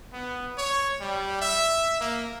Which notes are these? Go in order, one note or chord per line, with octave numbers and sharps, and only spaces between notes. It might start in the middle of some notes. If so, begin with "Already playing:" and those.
B3
C#5
G3
E5
A#3